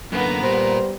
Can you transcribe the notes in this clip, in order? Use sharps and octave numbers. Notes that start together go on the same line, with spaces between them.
F#2 D3 A#3 B3 A#5
A#2 G3 A#4 C5